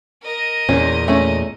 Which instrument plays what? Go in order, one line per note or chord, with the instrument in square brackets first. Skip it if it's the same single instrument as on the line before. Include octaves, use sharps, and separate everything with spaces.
[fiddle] A#4 D#5
[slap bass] E2 A#2 [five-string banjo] C#4
[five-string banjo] A3 C#4